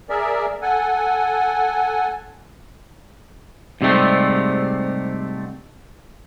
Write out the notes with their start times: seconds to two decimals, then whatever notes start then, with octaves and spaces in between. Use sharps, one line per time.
0.10 G#4 A#4 D5 E5
0.62 A4 F#5 G#5
3.81 G#2 C3 G3 A3 C4